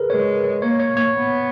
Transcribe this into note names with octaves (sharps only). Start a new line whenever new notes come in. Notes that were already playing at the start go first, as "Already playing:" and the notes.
Already playing: G#4 A#4 B4
G#3 C#5
A#3 C#5
C#5
C#5
B3